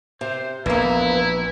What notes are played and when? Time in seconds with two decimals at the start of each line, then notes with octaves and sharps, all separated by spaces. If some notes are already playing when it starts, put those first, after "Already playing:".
0.21 C3 C5
0.66 A#1 E2 A#3 E4 B4